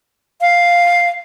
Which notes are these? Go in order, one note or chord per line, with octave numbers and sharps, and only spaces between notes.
F5